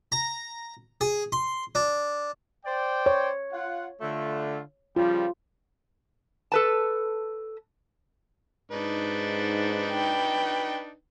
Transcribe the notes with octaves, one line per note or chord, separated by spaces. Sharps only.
A#5
G#4
C6
D4
C5 D5 G5
C#5
F4 F#5
D3 A3 F4
C#3 F3 G3 F4
A4 B4 A5
G#2 D4 D#4 B4
G5